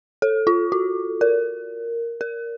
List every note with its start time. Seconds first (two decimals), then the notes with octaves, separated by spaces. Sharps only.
0.22 A4
0.47 F4
0.72 F#4
1.21 A#4
2.21 A#4